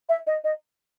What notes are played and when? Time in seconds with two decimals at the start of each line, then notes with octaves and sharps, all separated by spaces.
0.09 E5
0.27 D#5
0.44 D#5